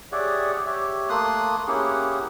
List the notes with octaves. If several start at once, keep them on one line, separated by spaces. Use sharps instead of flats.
G4 G#4 C#5 D5 E5 F#5
G4 C#5 E5
A3 A#3 C6 D#6 F#6
A#3 C#4 E4 G4 G#4 F#5